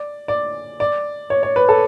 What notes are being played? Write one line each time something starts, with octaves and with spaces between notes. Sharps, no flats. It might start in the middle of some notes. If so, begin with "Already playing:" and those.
Already playing: D5
D5
D5
C#5
C#5
B4
A4